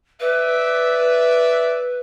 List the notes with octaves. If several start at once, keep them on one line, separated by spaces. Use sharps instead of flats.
B4 D5 E5